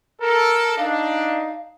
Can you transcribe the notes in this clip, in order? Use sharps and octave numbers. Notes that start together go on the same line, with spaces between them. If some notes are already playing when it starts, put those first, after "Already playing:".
A4 A#4
D4 D#4 F5